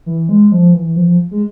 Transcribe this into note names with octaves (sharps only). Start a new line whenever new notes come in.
E3
G#3
F3
E3
F3
G#3